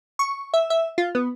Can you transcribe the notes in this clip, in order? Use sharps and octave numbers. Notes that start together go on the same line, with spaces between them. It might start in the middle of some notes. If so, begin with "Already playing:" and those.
C#6
E5
E5
F4
B3